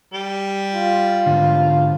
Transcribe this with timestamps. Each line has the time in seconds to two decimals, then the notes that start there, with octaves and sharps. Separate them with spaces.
0.13 G3
0.74 F4
1.26 G#2 D3